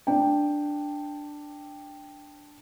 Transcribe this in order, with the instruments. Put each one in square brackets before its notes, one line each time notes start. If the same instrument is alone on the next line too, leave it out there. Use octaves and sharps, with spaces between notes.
[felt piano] D4 G5